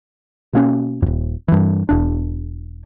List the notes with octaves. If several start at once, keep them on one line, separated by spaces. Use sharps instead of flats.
B2 A#3 C#4
D#1 F2
G2 E3
E1 D4